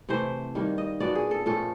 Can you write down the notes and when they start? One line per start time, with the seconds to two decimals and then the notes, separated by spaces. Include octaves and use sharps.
0.09 C3 E3 A3 C5
0.55 D#3 G3 A#3
0.78 D#5
1.00 A#2 F#3 B3 D4 D5
1.15 G#4
1.31 A4
1.46 A#2 F3 A3 C#4 A4